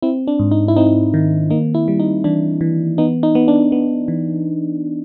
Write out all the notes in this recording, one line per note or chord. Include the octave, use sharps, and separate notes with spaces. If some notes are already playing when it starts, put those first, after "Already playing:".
C4 E4
D4
G#2
D#4
E4
C4 D#4
D#3
A#3 D#4
E4
G3
D#4
E3 D4
E3
B3 D#4
D#4
B3
D4
B3
E3